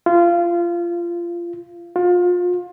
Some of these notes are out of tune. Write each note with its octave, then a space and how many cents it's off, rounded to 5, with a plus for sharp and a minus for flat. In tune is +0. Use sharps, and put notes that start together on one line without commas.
F4 -20
F4 +30